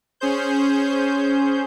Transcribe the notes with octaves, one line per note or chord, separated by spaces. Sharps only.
C#4 G#4 C5 G6